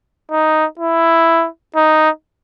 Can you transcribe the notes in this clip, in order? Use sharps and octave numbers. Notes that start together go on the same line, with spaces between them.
D#4
E4
D#4